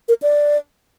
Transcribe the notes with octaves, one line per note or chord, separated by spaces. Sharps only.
A#4
D5